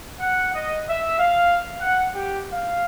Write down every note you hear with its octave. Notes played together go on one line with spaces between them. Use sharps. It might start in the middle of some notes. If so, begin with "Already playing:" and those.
F#5
D#5
E5
F5
F#5
G4
F5